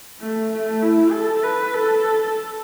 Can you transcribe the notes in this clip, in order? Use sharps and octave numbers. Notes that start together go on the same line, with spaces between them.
A3
A3
E4
A4
B4
A4